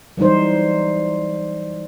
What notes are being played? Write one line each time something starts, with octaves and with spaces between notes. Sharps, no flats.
E3 F#3 G3 D#4 C5